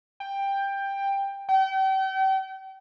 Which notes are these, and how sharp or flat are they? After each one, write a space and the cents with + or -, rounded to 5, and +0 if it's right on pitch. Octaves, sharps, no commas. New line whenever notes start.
G5 +10
G5 -40